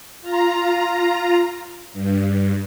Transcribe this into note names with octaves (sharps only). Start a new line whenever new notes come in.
F4 A#5
G2